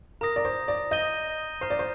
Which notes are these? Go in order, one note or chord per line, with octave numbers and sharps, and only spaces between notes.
A#4 A#5 D#6 A#6
D5
C5
D5
D#5 G6 A#6 D#7 G7
C5 A#5 F6 C7 G7
D5
C5